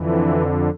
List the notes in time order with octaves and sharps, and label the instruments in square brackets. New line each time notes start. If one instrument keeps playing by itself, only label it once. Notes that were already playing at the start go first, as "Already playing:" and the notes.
Already playing: [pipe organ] F2 D3 E3